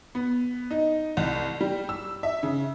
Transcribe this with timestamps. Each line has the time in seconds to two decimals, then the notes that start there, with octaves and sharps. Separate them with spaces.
0.15 B3
0.71 D#4
1.17 C2
1.61 G3
1.89 E6
2.23 E5
2.43 C#3